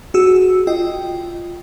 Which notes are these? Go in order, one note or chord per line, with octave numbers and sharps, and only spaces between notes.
F#4 G#4 E6
F4 D#5 G5